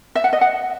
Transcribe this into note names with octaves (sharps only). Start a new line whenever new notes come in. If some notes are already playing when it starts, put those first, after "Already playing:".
E5
F#5
D#5
F#5